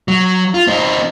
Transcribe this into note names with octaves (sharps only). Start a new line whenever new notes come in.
F#3
F4
C4 D#4